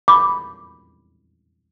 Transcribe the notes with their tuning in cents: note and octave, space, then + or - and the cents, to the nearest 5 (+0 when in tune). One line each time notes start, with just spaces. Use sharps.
B5 +0 D6 +0